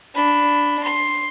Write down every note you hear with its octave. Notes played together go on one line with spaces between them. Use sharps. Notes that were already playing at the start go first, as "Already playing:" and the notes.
D4 B5
C6